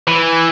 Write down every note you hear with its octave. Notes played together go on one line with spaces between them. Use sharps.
E3